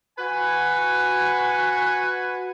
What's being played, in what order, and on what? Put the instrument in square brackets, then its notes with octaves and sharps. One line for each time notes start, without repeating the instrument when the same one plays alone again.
[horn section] F#4 B4 G#5